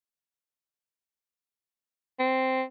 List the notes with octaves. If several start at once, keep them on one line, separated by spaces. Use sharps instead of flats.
C4